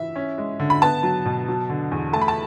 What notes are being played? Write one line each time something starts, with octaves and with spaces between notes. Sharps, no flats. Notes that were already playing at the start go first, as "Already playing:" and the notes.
Already playing: E3 E5
C#4
G#3
D3
B5
B3 A5
F#3
B2
F#3
D3
E2
A3 A5
B5
A5